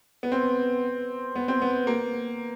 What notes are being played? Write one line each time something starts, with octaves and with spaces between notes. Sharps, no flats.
B3
C4
B3
C4
B3
A#3